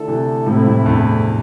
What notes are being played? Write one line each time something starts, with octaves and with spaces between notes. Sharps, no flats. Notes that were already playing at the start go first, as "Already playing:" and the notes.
Already playing: D3 A3 E4 A4
C3 E3
A2 C3 A3 C4 E4
F2 A2
E2 G2